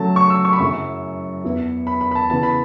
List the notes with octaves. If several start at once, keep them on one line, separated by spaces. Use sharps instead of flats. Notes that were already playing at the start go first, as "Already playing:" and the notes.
Already playing: C#3 F#3 A3 A5
C#6
E6
C#6
B5
F#2 C#3 F#3 C#4 E4 C#6
E2 E3 B3 E4
B5
B5
B5
A5
C#3 E3 B3 A5
B5